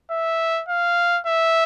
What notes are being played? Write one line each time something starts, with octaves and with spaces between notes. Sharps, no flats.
E5
F5
E5